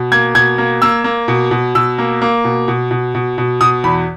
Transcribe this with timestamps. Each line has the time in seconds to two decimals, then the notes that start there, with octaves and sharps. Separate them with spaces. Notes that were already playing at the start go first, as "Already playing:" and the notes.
Already playing: B2
0.12 A#3 G#6
0.35 B2 G#6
0.58 A#3
0.82 A#3 E6
1.04 A#3
1.28 B2
1.51 B2
1.75 B2 E6
1.98 A#3
2.22 A#3
2.45 B2
2.68 B2
2.91 B2
3.15 B2
3.38 B2
3.61 B2 D#6
3.84 E2 B5